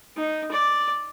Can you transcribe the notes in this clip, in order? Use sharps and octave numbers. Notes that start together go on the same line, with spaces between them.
D#4
D5